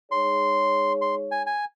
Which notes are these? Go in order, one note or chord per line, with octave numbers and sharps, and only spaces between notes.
G#3 D#4 G#4 C#5 C6
C6
G#5
G#5